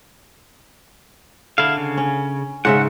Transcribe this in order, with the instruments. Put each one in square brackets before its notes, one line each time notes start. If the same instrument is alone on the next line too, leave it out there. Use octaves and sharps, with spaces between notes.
[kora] D3 [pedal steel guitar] E4 F5
[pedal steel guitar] C#3
[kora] C#4
[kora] G#2 C#3 E5 [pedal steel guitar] F#5